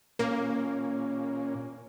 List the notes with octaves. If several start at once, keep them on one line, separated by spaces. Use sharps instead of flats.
A#2 A#3 C#4